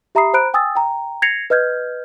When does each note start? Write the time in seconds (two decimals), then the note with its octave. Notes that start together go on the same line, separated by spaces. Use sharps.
0.15 G4 E5 A#5 B5 D#6 C7
0.34 C5 A#5 B5 F#6 D7
0.54 G5 G#5 D#6 E6 A6
0.75 G5 A#5
1.22 G#6 A#6 C7 C#7 F7
1.50 B4 D#5 F6 G6 G#6